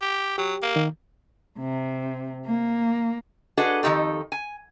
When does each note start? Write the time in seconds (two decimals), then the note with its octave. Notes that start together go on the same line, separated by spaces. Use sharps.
0.02 G4
0.38 F#3 G4
0.62 A#3
0.76 D#3
1.59 C3
2.46 A#3
3.57 D4 F#4 G#4 A4 B4 D#5
3.83 F2 D#3 F3 D#4 G4 A4
4.32 G#5